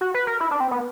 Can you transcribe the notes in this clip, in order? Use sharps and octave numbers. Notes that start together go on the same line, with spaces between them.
F#4
B4
A#4
E4
D4
C4
B3